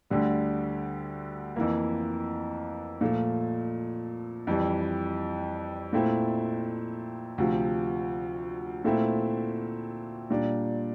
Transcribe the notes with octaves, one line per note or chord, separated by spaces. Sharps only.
D2 D3 G3
F2 E3 A#3
A#2 F3 A3
F2 E3 G3
A#2 A3 C4 E4
D2 C3 F3
A#2 A3 C4 E4
A#2 G3 D4